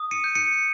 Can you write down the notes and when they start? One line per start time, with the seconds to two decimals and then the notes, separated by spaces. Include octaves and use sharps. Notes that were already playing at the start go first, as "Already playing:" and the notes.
Already playing: D#6
0.11 C#7 D#7
0.24 G6
0.35 C#7 D#7